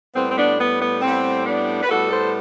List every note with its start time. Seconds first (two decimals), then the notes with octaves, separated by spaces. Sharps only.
0.15 A2 G3 B3 C4
0.30 C4
0.37 B3 D4
0.59 B3
0.80 B3
1.02 A2 G3 B3 C4
1.46 B3 D4
1.83 B4
1.89 A2 G3 B3 F#4 A4
2.11 A4 C5